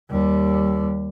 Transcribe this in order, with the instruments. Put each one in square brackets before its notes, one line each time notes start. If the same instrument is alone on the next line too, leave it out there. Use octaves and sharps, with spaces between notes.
[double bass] D#2 G3